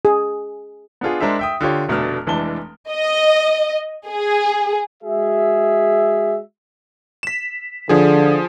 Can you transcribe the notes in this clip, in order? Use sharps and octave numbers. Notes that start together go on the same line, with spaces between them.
G#4
B3 D4 F4 G#4
G#3 D4 A#4 C5 E5
E5 G5 D#6
D3 F4 G4 C#5
F1 B2 A3 D4 F6
F1 E3 G#3 D4 A5 G7
D#5
G#4
G#3 F#4 G#4 E5
B6 E7
D3 F3 G#4